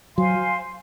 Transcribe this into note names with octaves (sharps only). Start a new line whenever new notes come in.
F#3 C5 F5 G#5 C6